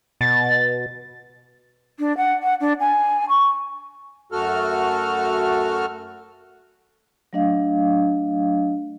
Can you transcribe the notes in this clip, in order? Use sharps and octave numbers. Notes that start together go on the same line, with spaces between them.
B2 A6
D4
F#5
F#5
D4
G#5
C#6
F#2 A3 F#4 A4 F6
F#3 A3 D4 D#5 F5